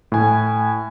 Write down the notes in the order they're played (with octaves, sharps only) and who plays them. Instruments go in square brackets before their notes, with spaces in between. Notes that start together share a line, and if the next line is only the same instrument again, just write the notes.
[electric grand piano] A2 G#5